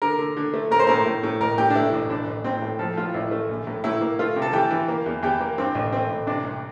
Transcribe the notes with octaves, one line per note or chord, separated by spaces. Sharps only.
D3 A#4
D3
D3
A3
A2 A#4
C5
A2 A#4
A2
A2
A1 A#4
A2 G4
D4
A3 E4
A1
A1 D4
A1
A2 C4
A2
F3 A4
A2 F4
A1 E4
A3
A#1
A2
A2 E4
A#3
A3 F4
C3
A4
E3 G4
E3
A#3
E2
E2 G4
A#3
G2 C4
A1
A3 C4
A1
C3 D4
C2